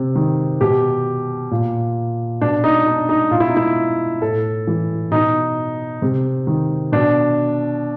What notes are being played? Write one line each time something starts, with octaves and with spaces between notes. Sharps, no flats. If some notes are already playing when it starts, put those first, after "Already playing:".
Already playing: C3
D#3
B2 G4
A#2
B2 D4
D#4
D4
D#4
B2 F4
E4
D#4
E4
A2 A4
E3
B2 D#4
C3
D#3
B2 D4